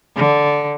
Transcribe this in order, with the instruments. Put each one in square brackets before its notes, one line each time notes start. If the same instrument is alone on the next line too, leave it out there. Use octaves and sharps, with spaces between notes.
[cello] D3